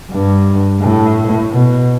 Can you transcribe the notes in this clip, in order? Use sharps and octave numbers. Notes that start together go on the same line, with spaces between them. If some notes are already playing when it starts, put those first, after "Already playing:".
G2
A2
B2